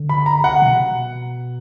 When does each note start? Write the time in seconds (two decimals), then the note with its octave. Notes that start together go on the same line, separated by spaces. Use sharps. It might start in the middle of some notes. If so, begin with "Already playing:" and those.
Already playing: D3
0.09 B5
0.26 A#5
0.44 F#5
0.62 B2